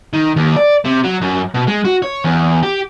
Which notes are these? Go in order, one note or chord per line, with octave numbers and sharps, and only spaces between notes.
D#3
D#2
D5
C3
F#3
F#2
B2
G#3
F#4
C#5
E2
G4